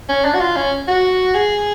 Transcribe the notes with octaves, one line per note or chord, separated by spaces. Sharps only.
C#4
D4
F#4
F4
C#4
F#4
G#4